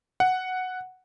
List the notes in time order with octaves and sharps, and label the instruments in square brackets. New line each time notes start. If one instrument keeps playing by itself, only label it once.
[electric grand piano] F#5